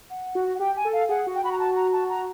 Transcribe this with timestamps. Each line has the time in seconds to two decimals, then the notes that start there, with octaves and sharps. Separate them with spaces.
0.10 F#5
0.35 F#4
0.54 F#5
0.60 G4 G5
0.77 G#5
0.85 A4
0.93 F5
1.09 G#4 F#5
1.27 F#4
1.35 G5
1.44 F#4 B5
1.52 A#5
1.59 A5
1.76 A#5
1.93 A5
2.09 A#5